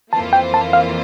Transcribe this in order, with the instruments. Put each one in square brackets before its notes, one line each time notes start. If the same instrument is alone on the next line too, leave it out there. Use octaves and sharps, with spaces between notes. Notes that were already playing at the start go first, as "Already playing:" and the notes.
[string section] F2 E3 A#3 F4 C5 [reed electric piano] A5
[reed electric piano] G5
A5
F5